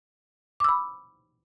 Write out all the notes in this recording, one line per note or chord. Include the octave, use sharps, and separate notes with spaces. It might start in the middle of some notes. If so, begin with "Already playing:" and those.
B5 D6 E6